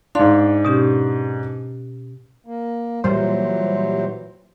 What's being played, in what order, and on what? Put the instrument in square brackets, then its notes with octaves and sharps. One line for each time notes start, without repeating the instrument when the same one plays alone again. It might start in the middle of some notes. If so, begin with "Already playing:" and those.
[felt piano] G#2 D4 [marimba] F5 C6
[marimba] B2 C#4 G4
[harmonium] A#3
[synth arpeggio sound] A#2 G3 C5 [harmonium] E3 F#3